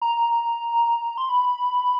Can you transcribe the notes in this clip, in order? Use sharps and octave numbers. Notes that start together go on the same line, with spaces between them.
A#5
C6
B5